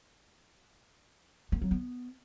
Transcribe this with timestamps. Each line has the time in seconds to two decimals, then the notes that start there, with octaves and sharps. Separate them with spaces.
1.52 A#3
1.62 F#3
1.71 B3